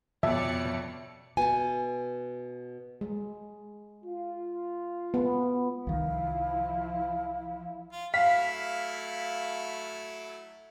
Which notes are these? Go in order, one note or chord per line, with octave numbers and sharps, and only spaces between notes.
F2 B2 C#5 D5 E5 C#7
B2 G#5 A5
G#3
F4
B3
C2 D#3 F3 E4 F5
F4
F#3 A3 E4 F5 B6